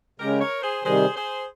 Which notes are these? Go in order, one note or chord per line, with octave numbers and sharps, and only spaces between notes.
C#3 G#3 C#4 G4 A#4
A#4 C#5
G#4 C5
C3 D#3 G3 G#4 C5
G#4 C5